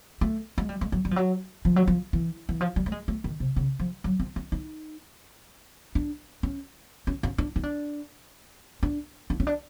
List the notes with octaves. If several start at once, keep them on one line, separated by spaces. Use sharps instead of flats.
A3
G#3
G3
G#3
F#3
G3
F3
F#3
F3
F#3
F3
E3
E3
F3
G3
A3
G#3
A3
D#3
C3
C#3
F3
F#3
C4
C#4
D#4
D4
C#4
C#4
C#4
D4
D#4
D4
D4
D4
C#4
D4